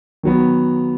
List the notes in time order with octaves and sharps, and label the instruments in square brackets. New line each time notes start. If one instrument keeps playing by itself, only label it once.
[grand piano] D#3 F#3 B3